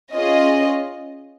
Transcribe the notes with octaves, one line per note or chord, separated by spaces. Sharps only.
C#4 F4 G#4 D#5